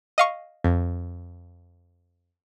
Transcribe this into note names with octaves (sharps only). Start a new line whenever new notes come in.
D#5 F5 C#6
F2